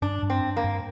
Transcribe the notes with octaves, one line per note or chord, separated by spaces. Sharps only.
G2 D4
G2
C4
A#3
G2